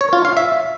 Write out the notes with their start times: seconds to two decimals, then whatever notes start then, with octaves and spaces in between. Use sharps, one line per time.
0.01 C#5
0.13 F4
0.25 F5
0.37 E5